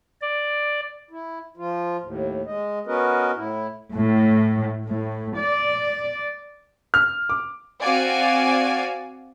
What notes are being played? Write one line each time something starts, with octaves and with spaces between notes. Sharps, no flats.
D5
E4
F3 F4
D#2 A2
G#3 D#5
B3 C#4 F#4 A#4 B4 D#5
A2 E4
A2
A2
D5
F6
D6
C4 F#4 D5 F5 G#5